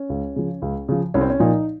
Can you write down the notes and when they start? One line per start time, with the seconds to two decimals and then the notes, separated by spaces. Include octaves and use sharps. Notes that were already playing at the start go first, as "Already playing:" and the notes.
Already playing: C#4
0.09 C#2
0.36 C#3 F3
0.62 C#2
0.89 C#3 F3
1.14 C2 C#4
1.21 C4
1.30 C#4
1.40 A#2 F3 D#4